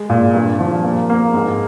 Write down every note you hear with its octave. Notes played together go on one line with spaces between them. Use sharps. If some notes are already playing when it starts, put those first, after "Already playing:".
Already playing: G#3
A#2
G2
F3
A#3
A#3
G#2